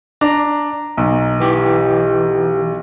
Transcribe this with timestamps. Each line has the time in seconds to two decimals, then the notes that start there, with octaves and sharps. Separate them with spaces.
0.21 D4 A#5
0.97 B1
1.40 E3 G4